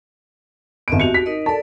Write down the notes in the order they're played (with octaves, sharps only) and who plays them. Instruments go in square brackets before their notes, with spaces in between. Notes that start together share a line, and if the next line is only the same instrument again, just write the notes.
[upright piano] G#1 D7 [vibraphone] B3 D#5 E5
[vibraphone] F#4 G4 [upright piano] C#7 F7
[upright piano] B6
[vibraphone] D#4 A#4 D#5
[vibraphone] A4 A#4 D5 [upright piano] A5